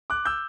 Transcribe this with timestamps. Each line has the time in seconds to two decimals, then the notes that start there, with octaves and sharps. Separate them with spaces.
0.10 D6 F#6
0.25 E6 G6